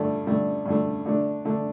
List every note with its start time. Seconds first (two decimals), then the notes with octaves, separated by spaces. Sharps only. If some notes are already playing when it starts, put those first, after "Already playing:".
Already playing: G2 D3 A3
0.27 G2 D3 A3
0.66 G2 D3 A3
1.06 D3 A3 D4
1.45 D3 A3 D4